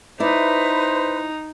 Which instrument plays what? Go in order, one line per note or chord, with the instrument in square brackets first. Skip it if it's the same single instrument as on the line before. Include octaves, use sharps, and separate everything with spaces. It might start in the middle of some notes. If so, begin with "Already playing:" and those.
[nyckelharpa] D#4 [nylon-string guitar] E4 D5 [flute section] B4 [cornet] C5